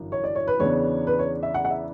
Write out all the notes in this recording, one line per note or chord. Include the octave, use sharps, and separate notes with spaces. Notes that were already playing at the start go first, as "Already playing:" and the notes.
Already playing: G1 F#2 E3
C#5
D5
C#5
B4
E2 C#3 E3 B3 D4 C#5
B4
C#5
E5
F#5
F#5
E5